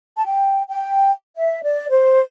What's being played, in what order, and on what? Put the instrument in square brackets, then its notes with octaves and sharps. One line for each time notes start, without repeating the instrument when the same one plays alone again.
[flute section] A5
G5
G5
E5
D5
C5